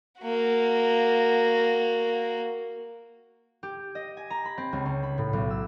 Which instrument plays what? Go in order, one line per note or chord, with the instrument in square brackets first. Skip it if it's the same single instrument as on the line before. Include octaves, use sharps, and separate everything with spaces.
[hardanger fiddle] A#3 F#4
[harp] G4
D#5
G#5
A#5
B5
C4
C#2
C#4
B5
A2
B1
E6